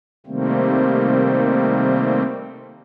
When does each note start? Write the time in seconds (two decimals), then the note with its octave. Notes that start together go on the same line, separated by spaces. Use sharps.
0.26 C3 D#3 G3 A3 A#3 C4